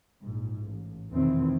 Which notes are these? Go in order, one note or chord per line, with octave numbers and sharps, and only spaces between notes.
A#1 G#2
A1
F1 E2 B2 D#3 E3 C4